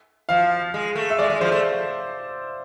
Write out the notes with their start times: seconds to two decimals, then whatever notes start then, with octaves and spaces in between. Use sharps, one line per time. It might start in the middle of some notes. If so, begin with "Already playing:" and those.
0.29 F3 F5
0.74 G#3
0.95 A3
1.10 E5
1.19 G#3 D5
1.30 G#3
1.41 F3 C5
1.52 A3